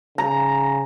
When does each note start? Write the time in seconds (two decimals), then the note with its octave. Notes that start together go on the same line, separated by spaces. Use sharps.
0.18 C#3 A#5